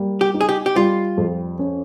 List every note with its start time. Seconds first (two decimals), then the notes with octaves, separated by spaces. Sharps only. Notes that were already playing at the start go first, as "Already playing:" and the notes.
Already playing: G3 A#3
0.21 G4
0.34 D#4
0.41 G#4
0.49 G4
0.66 G4
0.76 G3 F4
1.17 F2
1.59 C#4